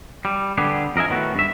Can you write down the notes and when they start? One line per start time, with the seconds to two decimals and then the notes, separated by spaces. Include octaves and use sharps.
0.25 G3
0.58 D3 G3 B3 G4 G#4
0.96 F2 A#4 D#5 E5 G#5
1.09 A2 D#3 B3 F#4
1.35 G2 E5